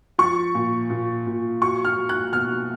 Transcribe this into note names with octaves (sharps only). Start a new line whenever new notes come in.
F3 C#6
A#2
A#2
A#2
F#3 C#6
F6
F#3
F#6
B2 F6